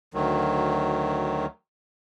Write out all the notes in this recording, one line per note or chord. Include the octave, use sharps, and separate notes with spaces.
D2 D#3 F#3